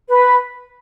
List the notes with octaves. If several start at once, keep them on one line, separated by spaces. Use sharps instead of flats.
B4